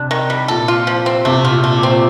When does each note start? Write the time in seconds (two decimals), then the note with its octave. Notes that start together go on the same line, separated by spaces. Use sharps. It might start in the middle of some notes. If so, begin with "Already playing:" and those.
Already playing: C3 D4
0.11 D#3
0.30 G3
0.48 A#2 A4
0.68 F4
0.87 F3
1.06 C4
1.25 C3 A3
1.45 F4
1.51 A#2
1.64 A3
1.77 A#2
1.83 C4